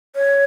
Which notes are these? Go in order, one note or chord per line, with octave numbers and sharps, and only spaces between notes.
C#5